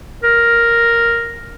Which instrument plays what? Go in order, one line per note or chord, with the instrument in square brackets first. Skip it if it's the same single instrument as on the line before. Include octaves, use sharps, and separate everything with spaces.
[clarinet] A#4